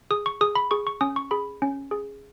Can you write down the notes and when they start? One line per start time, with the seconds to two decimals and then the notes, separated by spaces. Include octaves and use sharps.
0.11 G#4 D#6
0.26 C#6
0.41 G#4 D#6
0.55 B5
0.71 G#4 C#6
0.87 C#6
1.01 C#4 D#6
1.16 C#6
1.31 G#4 B5
1.62 C#4
1.91 G#4